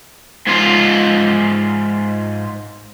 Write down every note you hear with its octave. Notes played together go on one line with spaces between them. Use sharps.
G#2 F4